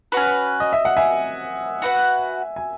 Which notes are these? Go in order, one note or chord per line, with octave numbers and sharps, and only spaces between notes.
C#4 F#4 B4
D#5
E5
F#5
E5 G#5
F#4 B4 F#5
G#5